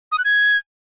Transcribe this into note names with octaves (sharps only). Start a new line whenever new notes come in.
D#6
F#6
G#6